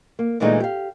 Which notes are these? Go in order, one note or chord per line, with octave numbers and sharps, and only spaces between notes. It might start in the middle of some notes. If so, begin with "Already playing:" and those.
A#3
D2 A#2 E3 G#3 A3 D#4
G4 F5